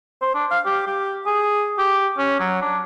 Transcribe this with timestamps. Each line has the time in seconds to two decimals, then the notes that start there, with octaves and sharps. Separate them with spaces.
0.22 C5
0.34 D4
0.51 F5
0.65 G4
0.87 G4
1.26 G#4
1.78 G4
2.18 C#4
2.40 F#3
2.62 D4